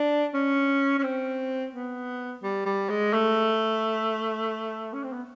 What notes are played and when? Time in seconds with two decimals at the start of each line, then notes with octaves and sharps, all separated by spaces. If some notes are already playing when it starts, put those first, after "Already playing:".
Already playing: D4
0.34 C#4
0.99 C#4
1.03 C4
1.73 B3
2.43 G3
2.66 G3
2.90 G#3
3.13 A3
4.93 C#4
5.03 C4
5.13 B3